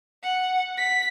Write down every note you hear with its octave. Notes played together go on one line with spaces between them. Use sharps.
F#5
B6